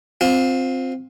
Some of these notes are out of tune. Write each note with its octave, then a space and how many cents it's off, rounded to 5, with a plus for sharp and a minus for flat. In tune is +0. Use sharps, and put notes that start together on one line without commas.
C4 +0 F4 +25